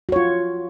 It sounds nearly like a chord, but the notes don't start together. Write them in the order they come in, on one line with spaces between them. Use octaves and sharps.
F#4 C#5 F4